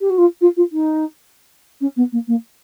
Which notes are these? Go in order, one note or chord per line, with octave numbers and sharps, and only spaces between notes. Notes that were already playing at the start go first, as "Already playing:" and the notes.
G4
F#4
F4
F4
F4
D#4
C#4
B3
A#3
A#3